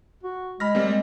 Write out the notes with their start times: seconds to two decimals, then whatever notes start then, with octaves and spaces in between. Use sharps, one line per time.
0.23 F#4
0.60 G#3 B5 F6 A#6
0.75 G3 A#3 C4
0.88 G#3